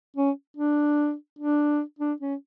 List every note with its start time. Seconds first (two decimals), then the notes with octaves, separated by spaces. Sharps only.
0.16 C#4
0.57 D4
1.39 D4
1.99 D4
2.20 C#4